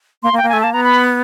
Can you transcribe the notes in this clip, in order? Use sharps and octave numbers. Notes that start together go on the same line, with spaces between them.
A#3 C6
A#3
G5
A#3
A3 G#5
A#3 A5
B3 A#5
B5